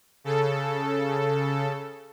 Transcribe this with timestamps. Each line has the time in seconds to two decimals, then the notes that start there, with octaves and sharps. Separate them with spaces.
0.24 C#3 A4